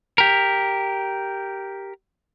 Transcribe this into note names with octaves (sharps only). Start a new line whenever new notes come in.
G4 A#4